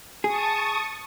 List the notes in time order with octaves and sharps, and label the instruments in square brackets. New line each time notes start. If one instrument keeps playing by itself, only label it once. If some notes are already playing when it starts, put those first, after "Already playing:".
[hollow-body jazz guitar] G#4 [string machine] A5 C#6 D#6